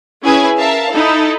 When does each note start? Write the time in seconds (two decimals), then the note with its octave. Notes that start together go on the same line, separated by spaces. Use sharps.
0.24 C#4 E4 G#4 B4 G#5
0.59 A#4 E5 F5 A5
0.91 D#4 E4 A4